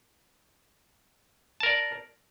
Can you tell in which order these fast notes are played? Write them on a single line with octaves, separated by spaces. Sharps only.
A5 A#4 D5